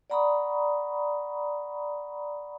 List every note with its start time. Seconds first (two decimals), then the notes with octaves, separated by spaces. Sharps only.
0.10 D5 F#5 A#5 B5 C#6 D#6